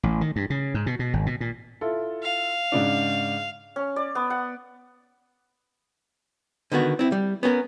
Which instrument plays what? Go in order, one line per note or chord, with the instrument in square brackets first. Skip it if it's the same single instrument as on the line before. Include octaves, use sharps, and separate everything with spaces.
[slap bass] A1
D#3
G2
C#3
G#2
B2
B2
G#1
B2
A#2
[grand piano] E4 F4 A4
[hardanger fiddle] F5
[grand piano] G#2 C#3 D4
[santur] C#4
D5
B3
F#5
[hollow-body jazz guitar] D3 D#3 B3 F#4
C4 E4
G3
B3 C#4 G#4 A#4